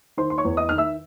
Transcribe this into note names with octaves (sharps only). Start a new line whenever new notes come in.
D#3 C5 C6
C6
C#5 C#6
E2
D#5 D#6
D#3 F6
E5 E6